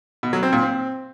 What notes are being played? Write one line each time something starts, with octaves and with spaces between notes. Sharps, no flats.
B2
F#3
C4
A#2
C4